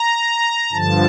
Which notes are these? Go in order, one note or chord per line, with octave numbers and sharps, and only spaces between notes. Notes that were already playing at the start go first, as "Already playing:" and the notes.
Already playing: A#5
G2 D3 F3 A5